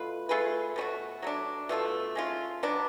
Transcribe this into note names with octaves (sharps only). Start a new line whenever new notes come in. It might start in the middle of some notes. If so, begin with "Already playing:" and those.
Already playing: B2 A3 F4 B4
A3 F4 G#4 B4
B2 A3 C#4 F#4
F#3 A3 D4
B2 A3 F4 A4
G#3 C#4 F4
B2 F#3 B3 D4